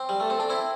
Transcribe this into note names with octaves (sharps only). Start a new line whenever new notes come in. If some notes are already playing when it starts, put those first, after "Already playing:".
Already playing: C4
G3
A3 A4
C4
D4
C4 E4